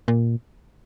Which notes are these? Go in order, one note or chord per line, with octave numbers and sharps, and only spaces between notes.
A#2